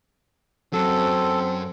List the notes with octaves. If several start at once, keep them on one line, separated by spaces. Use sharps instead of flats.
F#2 F#3 C4 A4